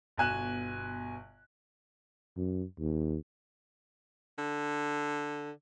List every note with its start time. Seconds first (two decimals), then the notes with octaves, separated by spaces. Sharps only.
0.17 G1 B2 G#5 F#6 E7
2.37 F#2
2.79 D#2
4.38 D3